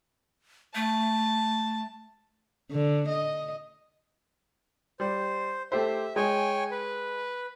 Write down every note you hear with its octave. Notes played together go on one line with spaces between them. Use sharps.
A3 A5
D3
D#5
G3 C5
A3 G4 C5 E5
G#3 C#5 G5 G#5
B4